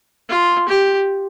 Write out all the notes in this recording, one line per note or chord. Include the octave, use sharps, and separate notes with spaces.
F4
G4